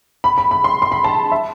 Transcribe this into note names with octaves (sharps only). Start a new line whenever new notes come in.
B5
B5
B5
C6
C6
B5
A5
E5